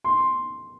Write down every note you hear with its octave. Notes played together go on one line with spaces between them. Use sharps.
C6